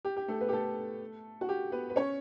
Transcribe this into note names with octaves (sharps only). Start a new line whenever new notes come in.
G4
G4
A3 A4
B3 B4
G4
A3 A4
F#4
G4
B3 B4
B4
C#4 C#5